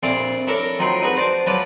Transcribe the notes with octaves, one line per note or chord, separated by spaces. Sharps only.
A#1 F2 E4 D5 F5
D4 E4 A4 A#4 C#5
F2 F#3 D#4 G5 B5 C6
D#4 F#4 G#4 B4
C5 D5 A5 C6
F3 F#3 B4 D5 A5